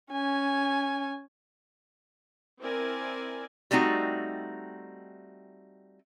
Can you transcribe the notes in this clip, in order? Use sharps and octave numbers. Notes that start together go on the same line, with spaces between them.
C#4 G#5
C4 E4 A#4 D5 G#5
G3 A3 C4 D#4 F#4